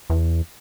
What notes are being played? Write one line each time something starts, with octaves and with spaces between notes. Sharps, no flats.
E2